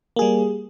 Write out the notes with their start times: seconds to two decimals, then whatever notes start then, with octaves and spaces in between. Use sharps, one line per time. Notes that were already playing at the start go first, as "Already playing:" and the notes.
0.16 A#3
0.19 G#4
0.22 G3